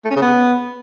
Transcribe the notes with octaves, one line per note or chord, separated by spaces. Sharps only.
A3
C#4
C#3
B3